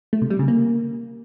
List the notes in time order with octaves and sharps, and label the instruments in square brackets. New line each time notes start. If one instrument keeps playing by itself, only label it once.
[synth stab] A3
C3
G3
C#3
A#3